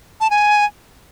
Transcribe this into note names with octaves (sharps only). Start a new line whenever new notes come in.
A5
G#5